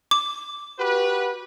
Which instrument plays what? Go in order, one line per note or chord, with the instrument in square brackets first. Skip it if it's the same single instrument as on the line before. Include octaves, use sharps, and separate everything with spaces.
[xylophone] D6
[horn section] F#4 G4 B4